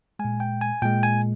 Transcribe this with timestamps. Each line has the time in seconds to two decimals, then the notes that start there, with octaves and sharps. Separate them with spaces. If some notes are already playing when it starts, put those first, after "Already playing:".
0.19 G#3 G#5
0.25 A#2
0.40 G5
0.61 G#5
0.82 A#2 G#3 G5
1.03 G#5